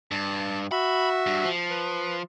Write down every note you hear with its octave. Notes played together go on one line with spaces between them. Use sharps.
G2 A5
F#4 E5 B5
G2
F3
B4